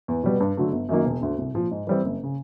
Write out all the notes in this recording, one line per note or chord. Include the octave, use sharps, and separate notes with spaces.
E2
B2 G3 B3
G2
D3 F#3 A3
G1
F#2 D#3 F#3 A#3
E1
D2 D3
C2
A#2 F3
G#2
E3 G3 C4
F#1
C#3